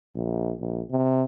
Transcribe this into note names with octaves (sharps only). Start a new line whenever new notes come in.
A#1
A#1
C3